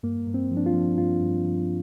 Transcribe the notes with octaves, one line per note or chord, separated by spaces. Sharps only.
G2 A#3
G2
C4
F3
D4
F4
F3
G2 F4
G2
F3